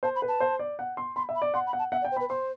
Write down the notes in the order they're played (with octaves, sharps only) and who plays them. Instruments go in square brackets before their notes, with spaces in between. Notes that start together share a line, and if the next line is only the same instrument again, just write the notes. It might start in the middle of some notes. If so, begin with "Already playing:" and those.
[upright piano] C5 [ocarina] A5
[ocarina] B5
[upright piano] B4
[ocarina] A5
[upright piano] C5
D5
F#5
C6
[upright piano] B5 [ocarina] C6
[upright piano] E5
[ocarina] B5
[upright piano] D5
[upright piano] F#5 [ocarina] C6
[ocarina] B5
[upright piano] F#5
[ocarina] A5
[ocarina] E5 [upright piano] F#5
[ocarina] D5
[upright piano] G5
[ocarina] C5
[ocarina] B4 [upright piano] B5
[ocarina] C5 [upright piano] C6